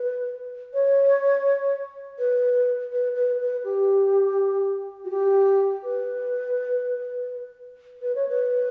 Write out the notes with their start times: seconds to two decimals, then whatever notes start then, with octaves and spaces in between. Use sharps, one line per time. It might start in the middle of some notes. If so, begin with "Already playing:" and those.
Already playing: B4
0.73 C#5
2.18 B4
2.92 B4
3.15 B4
3.41 B4
3.64 G4
5.04 F#4
5.10 G4
5.83 B4
8.01 B4
8.15 C#5
8.28 B4